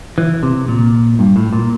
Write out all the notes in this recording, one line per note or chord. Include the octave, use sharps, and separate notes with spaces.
E3
C3
A#2
G2
A2
A#2